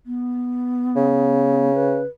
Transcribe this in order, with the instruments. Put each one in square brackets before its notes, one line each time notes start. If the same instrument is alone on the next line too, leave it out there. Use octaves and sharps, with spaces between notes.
[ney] B3
[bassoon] C#3
[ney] B4